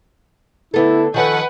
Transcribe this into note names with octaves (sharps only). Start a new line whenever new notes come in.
D3 B3 E4 A4
D#3 F3 A4 B4 C#5 F#5 G#5